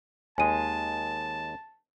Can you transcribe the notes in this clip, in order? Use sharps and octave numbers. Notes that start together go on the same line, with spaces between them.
D#2 G#3 G#5 A5 D#7